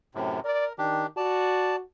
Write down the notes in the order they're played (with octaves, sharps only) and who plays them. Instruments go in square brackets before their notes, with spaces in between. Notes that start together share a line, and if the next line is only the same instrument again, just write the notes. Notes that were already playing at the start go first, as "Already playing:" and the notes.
[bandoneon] F#2 A2 C3
[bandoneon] A#4 [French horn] D5
[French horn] D#3 [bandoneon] D4 G4
[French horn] F#4 [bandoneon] D5 A5